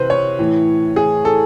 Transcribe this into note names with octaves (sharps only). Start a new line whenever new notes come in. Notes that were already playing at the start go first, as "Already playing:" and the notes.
Already playing: C3 E3 B4 C5
C#5
A2 E3
G#4
A4